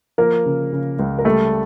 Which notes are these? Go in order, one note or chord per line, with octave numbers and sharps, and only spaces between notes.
F3 A#3 A#4
C#3
C#3
C#2
A#4
G3 A3 A4